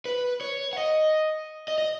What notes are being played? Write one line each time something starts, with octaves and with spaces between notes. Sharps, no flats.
B4
C#5
F#5
D#5
D#5
D#5